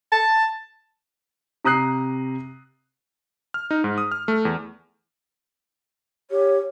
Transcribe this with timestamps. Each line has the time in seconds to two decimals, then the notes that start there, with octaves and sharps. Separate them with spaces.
0.12 A5
1.65 C3 A#5 D#6 F#6 C7
3.54 F6
3.71 D#4
3.84 G#2
3.98 D#6
4.12 F6
4.28 A3
4.45 E2
6.31 G4 C#5